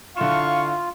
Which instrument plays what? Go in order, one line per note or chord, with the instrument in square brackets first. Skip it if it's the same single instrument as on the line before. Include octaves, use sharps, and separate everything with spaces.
[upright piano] D3 E4 E7 [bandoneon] F4 [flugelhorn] F5 [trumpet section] C#6